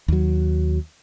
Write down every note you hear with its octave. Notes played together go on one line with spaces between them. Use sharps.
D#2 F#3